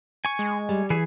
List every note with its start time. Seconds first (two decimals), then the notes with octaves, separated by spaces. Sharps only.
0.25 G#5 C#6
0.39 G#3
0.69 G3
0.90 E3 G#4